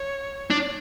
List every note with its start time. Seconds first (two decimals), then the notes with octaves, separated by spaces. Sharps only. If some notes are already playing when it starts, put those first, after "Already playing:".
Already playing: C#5
0.50 D4